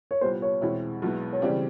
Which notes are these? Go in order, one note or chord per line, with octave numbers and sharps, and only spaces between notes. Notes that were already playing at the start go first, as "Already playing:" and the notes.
C#5
C2 A#2 G3 B3 C5
C#5
E2 B2 G#3 C4 E4
B1 B2 G#3 B3 E4
C#5
C#3 E3 G3 C4 D5